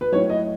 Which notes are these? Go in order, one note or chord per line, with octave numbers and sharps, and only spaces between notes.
B4
A2 F#3 C#5
D#5